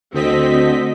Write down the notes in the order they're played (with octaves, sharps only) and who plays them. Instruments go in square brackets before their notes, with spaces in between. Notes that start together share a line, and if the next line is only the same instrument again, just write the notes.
[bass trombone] D2 [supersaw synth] D3 D#5 B6 [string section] C4